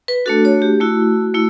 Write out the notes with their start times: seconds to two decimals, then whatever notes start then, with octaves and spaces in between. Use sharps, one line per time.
0.08 B4
0.26 A3 D4 F#4 A4
0.45 C#5
0.62 G4
0.80 A3 E4 F#4
1.34 A3 E4